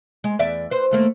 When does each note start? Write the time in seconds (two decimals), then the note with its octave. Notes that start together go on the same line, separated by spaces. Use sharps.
0.24 G#3
0.39 E2 D5 E5
0.71 B4 C5
0.91 D#2 A3 A#3